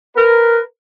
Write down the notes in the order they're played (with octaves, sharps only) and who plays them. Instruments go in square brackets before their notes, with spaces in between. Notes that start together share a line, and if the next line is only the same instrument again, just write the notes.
[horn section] A#4 B4